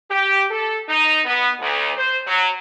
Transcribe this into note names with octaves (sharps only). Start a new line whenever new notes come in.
G4
A4
D#4
B3
D2
C5
F#3